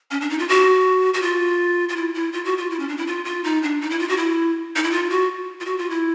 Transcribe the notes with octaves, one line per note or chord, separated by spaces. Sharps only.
C#4
D4
D#4
F4
F#4
F#4
F4
F4
E4
E4
F4
F#4
F4
E4
C#4
D4
E4
F4
F4
D#4
D4
D#4
E4
F4
F#4
E4
D#4
E4
F4
F#4
F4
F#4
F4
E4